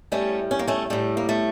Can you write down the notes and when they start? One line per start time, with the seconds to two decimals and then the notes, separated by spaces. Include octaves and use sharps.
0.12 A2 G3 A3 C#4
0.51 C#4
0.59 A#3
0.67 A3 C#4
0.90 A2 G3 A3
1.17 A#3
1.29 A3